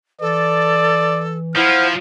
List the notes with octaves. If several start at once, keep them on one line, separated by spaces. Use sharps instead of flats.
E3 A4 D5
F3 E4 C5 F#5 F6 G6